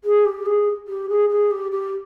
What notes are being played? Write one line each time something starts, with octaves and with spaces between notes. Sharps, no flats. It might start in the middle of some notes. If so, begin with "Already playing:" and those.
G#4
G4
G#4
G4
G#4
G#4
G4
G4